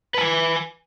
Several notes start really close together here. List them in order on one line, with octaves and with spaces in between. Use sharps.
B4 A5 G#5